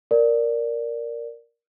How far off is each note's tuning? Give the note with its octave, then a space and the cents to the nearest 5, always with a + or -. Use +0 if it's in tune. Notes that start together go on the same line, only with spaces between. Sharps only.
A#4 +0 D5 +0